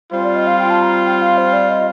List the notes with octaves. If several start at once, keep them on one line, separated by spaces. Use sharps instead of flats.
G3 C4 F4 C5
D5
D#5
F5
G5
A5
A#5
G5
F5
C5
D5
D#5